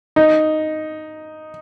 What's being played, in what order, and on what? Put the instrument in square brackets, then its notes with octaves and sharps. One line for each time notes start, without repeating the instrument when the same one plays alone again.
[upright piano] D#4